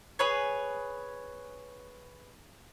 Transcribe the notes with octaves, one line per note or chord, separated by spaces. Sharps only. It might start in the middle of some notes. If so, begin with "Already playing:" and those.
G#4 B4 C#5